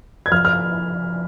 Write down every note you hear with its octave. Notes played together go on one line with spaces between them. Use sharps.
G#6
F3 F6
F6